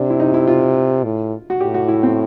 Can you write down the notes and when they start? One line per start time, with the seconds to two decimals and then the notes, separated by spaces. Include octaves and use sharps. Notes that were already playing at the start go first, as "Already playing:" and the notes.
Already playing: C3 D4
0.10 E4
0.20 D#4
0.34 E4
0.47 F4
1.04 A2
1.50 F#4
1.60 A2 G4
1.74 F#4
1.88 E4
2.03 C4